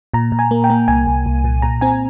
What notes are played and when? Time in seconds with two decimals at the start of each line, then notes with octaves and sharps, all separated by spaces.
0.14 A#2 A#5
0.32 A#2
0.39 G#5
0.51 A#3
0.64 G5
0.70 A#3
0.88 C2 G#5
1.07 C2
1.26 C2
1.44 A#2
1.62 A#2 A#5
1.81 C4 G#5